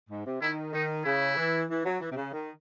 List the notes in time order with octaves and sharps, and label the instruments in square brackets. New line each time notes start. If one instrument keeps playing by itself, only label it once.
[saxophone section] G#2
C3
[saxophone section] D#3 [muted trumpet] E4
[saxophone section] D#3 [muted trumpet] D#4
[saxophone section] C#3 [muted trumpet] E4
[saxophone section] E3
E3
F#3
E3
C3
C#3
D#3